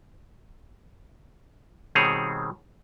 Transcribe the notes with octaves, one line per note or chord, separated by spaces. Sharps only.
B2 D#3 G3 C4 G#4 C#5